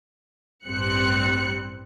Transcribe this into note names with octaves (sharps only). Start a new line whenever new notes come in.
A1 G2 G3 C4 F#6 C#7